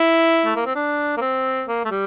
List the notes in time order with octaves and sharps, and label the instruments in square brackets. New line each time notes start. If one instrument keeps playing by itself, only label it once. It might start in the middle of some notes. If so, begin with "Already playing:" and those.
Already playing: [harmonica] E4
A3
A#3
C4
D4
A#3
C4
A#3
A3
G3